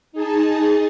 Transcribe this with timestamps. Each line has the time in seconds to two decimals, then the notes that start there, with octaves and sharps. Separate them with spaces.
0.12 D#4 G#4 A5